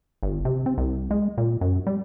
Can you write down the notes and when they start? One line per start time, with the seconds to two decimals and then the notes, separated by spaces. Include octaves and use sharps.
0.23 G1
0.45 C3
0.66 C4
0.78 C2
1.11 G#3
1.38 A#2
1.61 F#2
1.87 G3